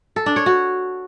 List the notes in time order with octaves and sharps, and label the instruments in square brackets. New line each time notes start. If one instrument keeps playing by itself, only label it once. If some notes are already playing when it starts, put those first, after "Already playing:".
[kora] A4
D4
C#5
F#4